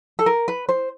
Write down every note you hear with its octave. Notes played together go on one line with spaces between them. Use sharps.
A4
A#4
B4
C5